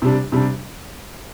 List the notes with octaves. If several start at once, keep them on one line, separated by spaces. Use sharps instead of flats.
C3 G3 D4
C3 G3 D4